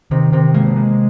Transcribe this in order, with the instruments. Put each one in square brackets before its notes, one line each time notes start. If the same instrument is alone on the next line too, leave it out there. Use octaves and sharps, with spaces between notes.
[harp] C3 [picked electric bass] D#3
[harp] C3 [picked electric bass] D#3
[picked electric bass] G#3 [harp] A#3
[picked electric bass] G#3